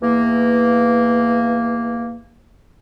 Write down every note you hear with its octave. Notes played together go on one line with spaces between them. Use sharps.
E2 E3 A#3